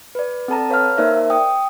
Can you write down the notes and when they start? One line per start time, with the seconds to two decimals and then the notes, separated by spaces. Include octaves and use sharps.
0.15 B4 D5
0.48 C4 A4 A5 A#5
0.70 B4 C#5 F5 A#5 F6
0.98 A#3 D#4 A#4 C5 D5 E5
1.30 G5 D#6